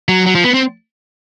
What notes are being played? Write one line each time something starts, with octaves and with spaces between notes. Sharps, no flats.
F#3
F#3
F3
B3
C4